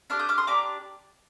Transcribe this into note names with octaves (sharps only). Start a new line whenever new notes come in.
D4 G4 D6 F6
D#6 G6
D6 F6
C6 D#6
D4 G4 A#5 D6